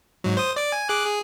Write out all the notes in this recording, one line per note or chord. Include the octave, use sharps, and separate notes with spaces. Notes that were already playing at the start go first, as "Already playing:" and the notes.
G#2 F#3
C5 D#6
D5 D6
G#5
G#4 D6 F#6
G#4